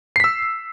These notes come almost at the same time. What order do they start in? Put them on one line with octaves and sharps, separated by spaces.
C7 B6 E6